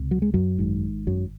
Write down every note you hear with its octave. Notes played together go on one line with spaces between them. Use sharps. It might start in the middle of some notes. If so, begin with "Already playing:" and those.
Already playing: C#2 C3
F#3
G#3
F#2 F#3
G#1 G#2
F#2 F#3